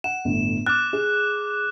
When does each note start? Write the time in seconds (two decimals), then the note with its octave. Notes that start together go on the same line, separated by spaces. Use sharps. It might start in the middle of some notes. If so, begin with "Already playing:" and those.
0.04 F#5 E7
0.25 G1 A2
0.66 D6 F6 F#6 A6
0.93 G#4